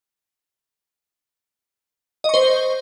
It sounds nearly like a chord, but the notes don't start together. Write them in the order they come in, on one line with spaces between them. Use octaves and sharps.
D#5 C#6 C5